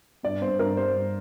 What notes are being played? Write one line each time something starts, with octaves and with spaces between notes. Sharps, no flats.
G2 D5
G2 C5
G2 A#4
G3 C5
G2